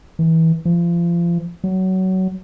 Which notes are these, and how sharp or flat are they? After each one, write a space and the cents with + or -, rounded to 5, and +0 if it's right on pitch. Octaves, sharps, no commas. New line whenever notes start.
E3 -25
F3 -30
F#3 +20